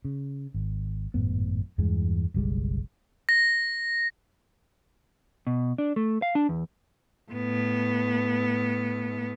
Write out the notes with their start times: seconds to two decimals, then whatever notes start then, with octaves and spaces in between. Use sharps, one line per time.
0.05 C#3
0.54 G#1
1.14 G#1 F#2 A2 B3
1.78 E2 G2 E3 G#3
2.34 F#1 B1 G3 G#3
3.29 A#6
5.47 B2
5.78 D4
5.96 A3
6.22 F5
6.35 D4
6.49 E2
7.31 A2 B3